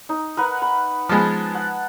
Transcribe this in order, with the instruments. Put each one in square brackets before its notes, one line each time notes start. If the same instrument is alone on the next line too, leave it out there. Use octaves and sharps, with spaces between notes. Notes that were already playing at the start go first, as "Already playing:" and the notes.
[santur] D#4
A#4 B4 F#5
B5
[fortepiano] F3 G#3 B3 [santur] A5
[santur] F#5